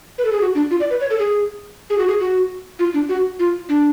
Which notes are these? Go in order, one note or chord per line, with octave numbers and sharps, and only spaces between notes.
B4
A4
G#4
F#4
D4
F4
D5
B4
C#5
A4
G#4
G#4
F#4
G#4
F#4
F4
D4
F#4
F4
D4